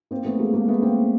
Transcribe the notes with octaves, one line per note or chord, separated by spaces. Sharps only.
A#3 C4
A3 B3
G#3 A#3
G#3 A#3
A3 B3
A#3 C4